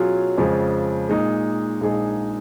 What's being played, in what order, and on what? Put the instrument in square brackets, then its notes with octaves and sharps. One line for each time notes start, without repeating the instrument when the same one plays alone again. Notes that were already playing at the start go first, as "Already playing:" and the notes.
Already playing: [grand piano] B2 F#3 C#4 F4 G#4
F2 C#3 F3 G#3
A#2 G#3 D#4
A#1 A#2 G#3 D#4 G#4